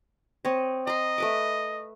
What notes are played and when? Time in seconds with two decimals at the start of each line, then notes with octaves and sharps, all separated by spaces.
0.45 C4 C#5 D#5
0.87 D#5 A#5 C6
1.18 A3 B4 D6